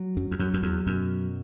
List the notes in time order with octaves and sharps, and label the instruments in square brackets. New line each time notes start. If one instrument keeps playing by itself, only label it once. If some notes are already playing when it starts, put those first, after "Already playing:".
Already playing: [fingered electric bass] F#3
[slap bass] F#2
E2
[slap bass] F#2 [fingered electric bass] F#3
[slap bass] F#2
E2
[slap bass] F#2 [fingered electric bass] B2